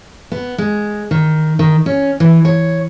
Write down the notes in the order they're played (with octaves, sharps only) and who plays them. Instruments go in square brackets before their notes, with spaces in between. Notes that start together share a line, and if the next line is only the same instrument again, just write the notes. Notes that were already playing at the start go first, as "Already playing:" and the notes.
[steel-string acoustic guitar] B3
G#3
D#3
D#3
C#4
E3
C#5